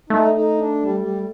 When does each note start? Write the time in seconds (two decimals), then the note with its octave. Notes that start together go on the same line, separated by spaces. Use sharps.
0.10 A3 D#4
0.34 D#4
0.58 D4
0.83 G3
1.00 G3